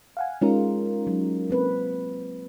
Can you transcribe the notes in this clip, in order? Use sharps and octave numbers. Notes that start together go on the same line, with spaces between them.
F5 F#5 G#5
G#3 C#4 D#4 F4 A#4
F#3
A#3 C4 B4